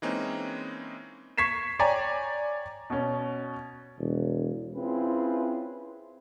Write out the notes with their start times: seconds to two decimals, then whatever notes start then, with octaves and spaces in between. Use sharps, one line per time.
0.02 E3 G#3 A#3 C4 C#4 D#4
1.38 C#6 G#6 B6 C7 E7
1.79 C#5 D5 G5 G#5 A#5
2.90 B2 C#4
3.98 E1
4.75 C4 C#4 E4 F4 G#4 B4